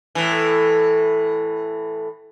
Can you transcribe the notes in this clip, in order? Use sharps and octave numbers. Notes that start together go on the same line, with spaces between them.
A2 E3